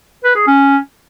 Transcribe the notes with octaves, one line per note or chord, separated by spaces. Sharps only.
B4
G#4
C#4